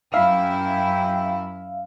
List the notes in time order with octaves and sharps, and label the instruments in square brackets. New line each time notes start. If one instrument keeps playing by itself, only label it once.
[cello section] F#2 E4 [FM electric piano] E5 F5 [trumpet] G5